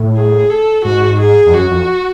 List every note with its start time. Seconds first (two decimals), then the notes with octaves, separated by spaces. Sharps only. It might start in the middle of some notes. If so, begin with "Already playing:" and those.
Already playing: A2
0.16 G#4
0.50 A4
0.85 G#2 F#4
1.20 G#4
1.46 F2
1.54 F#2 F#4
1.71 F2